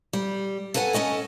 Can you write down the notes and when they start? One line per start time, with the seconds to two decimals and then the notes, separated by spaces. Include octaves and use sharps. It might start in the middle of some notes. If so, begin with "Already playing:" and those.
0.13 G3
0.74 A4 B4 C#5 F#5 G#5
0.93 C#4 A4 D#5 G#5